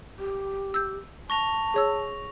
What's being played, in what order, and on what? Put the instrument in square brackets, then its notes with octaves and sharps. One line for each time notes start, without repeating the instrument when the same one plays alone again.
[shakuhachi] G4
[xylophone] E6 G6
[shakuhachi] A5 [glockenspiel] C#6 A#6 F7
[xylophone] G#4 C#5 E6